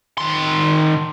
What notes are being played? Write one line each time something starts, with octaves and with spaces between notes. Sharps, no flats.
D#3 C6